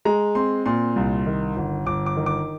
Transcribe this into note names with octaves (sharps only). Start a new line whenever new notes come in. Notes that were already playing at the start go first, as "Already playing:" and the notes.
G#3 A#5
C4 C6
A#2 C6
C2
D#3
G1
G1 D6
D6
D#3
D6